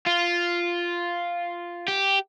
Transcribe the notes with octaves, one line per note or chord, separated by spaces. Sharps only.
F4
G4